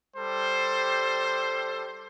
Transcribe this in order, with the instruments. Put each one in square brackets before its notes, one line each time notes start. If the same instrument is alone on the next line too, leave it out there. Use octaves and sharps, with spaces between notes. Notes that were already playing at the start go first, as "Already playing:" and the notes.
[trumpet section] G3 A4 C5